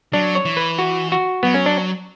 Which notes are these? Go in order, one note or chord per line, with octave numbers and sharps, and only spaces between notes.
F#3 D4
C#5
E3
B4
F#4
F#4
F#3 B3
C#4
D4